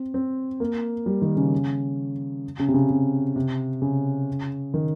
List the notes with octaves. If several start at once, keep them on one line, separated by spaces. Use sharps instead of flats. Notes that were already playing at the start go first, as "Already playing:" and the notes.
Already playing: C4
C4
A#3
G3
D#3
C#3
C#3
C3
C#3
C3
C3
C#3
D#3